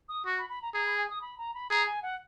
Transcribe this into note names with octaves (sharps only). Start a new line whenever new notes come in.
D#6
F#4 C#6
B5
B5
A#5
G#4 A#5
B5
G#5
D#6
B5
A#5
B5
G#4 A#5
G#5
F#5